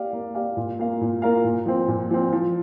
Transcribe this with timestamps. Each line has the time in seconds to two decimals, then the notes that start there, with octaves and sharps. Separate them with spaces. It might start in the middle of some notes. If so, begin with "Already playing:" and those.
Already playing: A#3 G4 D5 F5
0.13 A#3
0.35 G4 D5 F5
0.57 A#2
0.79 A#3 F4 A#4 F5
1.01 A#2
1.22 A#3 F4 A#4 F5
1.45 A#2
1.66 F3 C4
1.88 A#2
2.11 F3 C4
2.33 F3